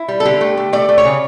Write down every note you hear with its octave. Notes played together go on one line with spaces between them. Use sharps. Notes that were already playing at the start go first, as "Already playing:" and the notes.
Already playing: E4
G3
A4
D3 G4
A3
A3
A3 D5
A3
C#5
C#3